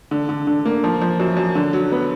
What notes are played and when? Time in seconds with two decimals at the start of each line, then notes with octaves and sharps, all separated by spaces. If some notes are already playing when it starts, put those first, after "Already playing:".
0.11 D3
0.29 D3
0.47 D3
0.65 A#3
0.84 F3
1.01 F3
1.20 F#2
1.37 F#2
1.55 D3
1.73 F#3
1.92 B3